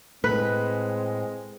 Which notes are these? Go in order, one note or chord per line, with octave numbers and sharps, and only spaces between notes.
A2 G#3 C4 B4